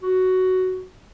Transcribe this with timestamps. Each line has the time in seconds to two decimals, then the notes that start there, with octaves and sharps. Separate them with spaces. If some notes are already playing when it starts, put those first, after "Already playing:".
0.03 F#4